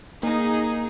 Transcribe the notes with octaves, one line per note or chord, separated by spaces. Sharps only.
A#3 D#4 G#4